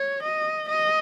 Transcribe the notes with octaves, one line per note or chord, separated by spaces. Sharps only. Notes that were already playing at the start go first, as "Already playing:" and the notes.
Already playing: C#5
D#5
D#5